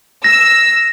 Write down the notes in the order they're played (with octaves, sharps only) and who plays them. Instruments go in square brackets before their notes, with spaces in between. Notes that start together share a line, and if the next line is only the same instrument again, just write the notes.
[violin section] E6 [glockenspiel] A#6